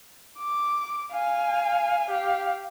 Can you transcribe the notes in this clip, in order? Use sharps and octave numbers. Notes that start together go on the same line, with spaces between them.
D6
F5 G#5
G4 F5